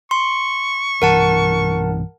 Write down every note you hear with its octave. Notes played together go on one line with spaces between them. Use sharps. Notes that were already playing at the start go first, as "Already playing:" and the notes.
C6 C#6
B1 G2 E3 A#4 F#5 A5